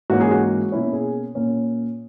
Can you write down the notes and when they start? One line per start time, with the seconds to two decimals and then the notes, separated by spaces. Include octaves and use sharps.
0.10 G#2 E3 A#3 C#4 F#4
0.21 G#4
0.31 F#4
0.72 B2 A#3 C#4 E4
0.93 G#4
1.35 A#2 A#3 C#4